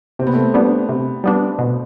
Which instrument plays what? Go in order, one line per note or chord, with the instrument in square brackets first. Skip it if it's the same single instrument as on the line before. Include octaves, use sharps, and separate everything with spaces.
[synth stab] C3 [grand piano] C4
[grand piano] B3
A3 C4
[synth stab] G3 B3 D4
C3
G3 B3 D4
B2